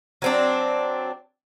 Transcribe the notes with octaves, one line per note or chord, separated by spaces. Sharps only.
F#3 C4 D4